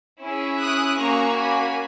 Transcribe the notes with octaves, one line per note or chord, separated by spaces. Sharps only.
C#4 E4 G#4
D#6 F#6
A#3 C#4 F#4 A#5 C#6
G#5 B5